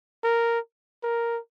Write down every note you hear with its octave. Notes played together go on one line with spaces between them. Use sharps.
A#4
A#4